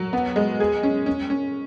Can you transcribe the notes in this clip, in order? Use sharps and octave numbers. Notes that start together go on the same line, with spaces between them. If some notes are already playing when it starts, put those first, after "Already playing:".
Already playing: F#3
B3
G#3
G#4
C#4
C#4
C#4